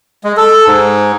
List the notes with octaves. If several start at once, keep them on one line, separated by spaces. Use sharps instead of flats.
G#3
A4
G#2